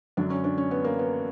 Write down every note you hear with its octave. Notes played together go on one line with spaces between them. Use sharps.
F#2 D3 F#3 D4
C#4
D4
C#4
B3
A#3
B3